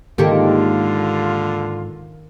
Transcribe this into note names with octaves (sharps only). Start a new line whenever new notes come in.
G#2 D3 D#3 G#3 A#3 F4 G4 A4